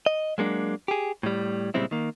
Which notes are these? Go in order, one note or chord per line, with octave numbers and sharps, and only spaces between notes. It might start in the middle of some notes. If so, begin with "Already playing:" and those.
D#5
F#3 G#3 A#3 D4
G4 G#4
A2 G3
A#2 C#3 G3 G#3 C4 E4
D#3 A#3